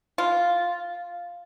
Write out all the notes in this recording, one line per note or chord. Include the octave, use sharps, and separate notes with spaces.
F4